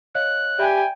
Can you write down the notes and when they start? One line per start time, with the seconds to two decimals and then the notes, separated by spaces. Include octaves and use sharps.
0.15 C#5 D#5 F5 F#6
0.59 G4 D5 E5 G5 G#5 B5